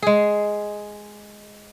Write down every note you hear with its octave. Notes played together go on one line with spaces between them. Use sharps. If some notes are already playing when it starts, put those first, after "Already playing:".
G#3 G#4